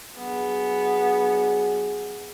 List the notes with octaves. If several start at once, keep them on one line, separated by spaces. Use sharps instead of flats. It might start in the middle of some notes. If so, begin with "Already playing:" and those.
F#3 B3 D4 G#4